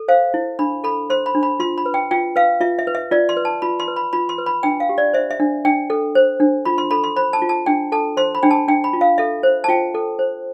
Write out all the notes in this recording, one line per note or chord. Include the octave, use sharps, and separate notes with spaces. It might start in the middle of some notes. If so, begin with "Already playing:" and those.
Already playing: A4
C5 F5
E4
D4 B5
A4 B5
C5 C6
B5
D4
B5
F4 C6
B5
B4
G5
F4 G5
B4 F5
F4 E5
E5
B4
E5
F4 D5
C6
B4
A5
F4 B5
C6
B4
B5
F4 B5
C6
B4
B5
D4 G5
F5
G4
D5
C5 E5
E5
D4
D4 G5
A4
C5
D4
F4 B5
C6
A4 B5
C6
C5 B5
A5
F4
A5
D4 G5
A4 A5
C5 C6
B5
D4 G5
A5
D4 G5
B5
F4
F5
A4 E5
C5
A5
F4 G5
A4
C5